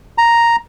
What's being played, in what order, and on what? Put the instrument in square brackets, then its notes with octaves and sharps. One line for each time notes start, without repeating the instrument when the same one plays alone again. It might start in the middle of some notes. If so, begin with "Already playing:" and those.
[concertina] A#5